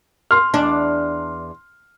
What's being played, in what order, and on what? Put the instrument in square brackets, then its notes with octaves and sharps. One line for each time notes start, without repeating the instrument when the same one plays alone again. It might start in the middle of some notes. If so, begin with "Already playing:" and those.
[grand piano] C6 F6
[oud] E2 D4